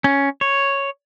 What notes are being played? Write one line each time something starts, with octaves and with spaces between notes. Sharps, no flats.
C#4
C#5